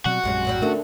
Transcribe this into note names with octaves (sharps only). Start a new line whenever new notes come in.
B2 F#3 G3 C4 F#4 F#6
A#1 F#2 C3 G#3 C#4
A2 F#3 G3
D2 D3 A3 C#4 D4 A4 A#4 E5